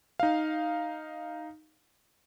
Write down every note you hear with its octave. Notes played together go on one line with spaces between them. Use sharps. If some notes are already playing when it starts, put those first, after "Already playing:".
D#4 F5